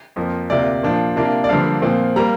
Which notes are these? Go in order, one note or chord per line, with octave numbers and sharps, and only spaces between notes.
F2 F3 A#3
D2 C3 A#3 F4 D5
A#2 F3 D4 F4
C3 A#3 D4 F4
D5
G2 D3 F3 A#3 D4 F5
A#2 F3 C4 F4
G3 A#3 A#5